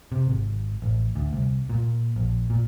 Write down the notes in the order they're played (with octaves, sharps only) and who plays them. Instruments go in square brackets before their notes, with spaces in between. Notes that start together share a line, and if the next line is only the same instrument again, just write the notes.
[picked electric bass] C3
G#1
A1
D2
C2
A#2
A#1
A#2